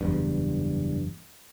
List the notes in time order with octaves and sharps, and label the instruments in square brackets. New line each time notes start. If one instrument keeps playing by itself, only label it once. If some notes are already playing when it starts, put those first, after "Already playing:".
[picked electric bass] F#1 E2 G2